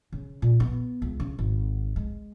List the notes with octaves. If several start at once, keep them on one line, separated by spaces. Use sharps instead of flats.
C#3
A#2
B3
C#2
C#3
G#1
G#3